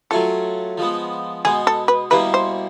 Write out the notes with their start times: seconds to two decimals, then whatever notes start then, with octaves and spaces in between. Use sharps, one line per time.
0.11 F#3 A3 C#4 F4 A4
0.78 F3 G#3 B3
1.45 B2 G#3 B3 G#4
1.67 A4
1.88 B4
2.10 B2 G3 A#3 C#4 E4 B4
2.34 C5